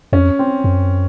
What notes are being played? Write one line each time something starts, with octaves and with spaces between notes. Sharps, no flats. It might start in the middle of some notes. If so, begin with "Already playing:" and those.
F2 C#4
C4
F#2